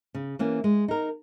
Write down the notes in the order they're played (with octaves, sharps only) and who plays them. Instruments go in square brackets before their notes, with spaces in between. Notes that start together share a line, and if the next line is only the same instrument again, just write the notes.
[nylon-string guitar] C#3
E3 A#3 C#4
G#3
D#4 A#4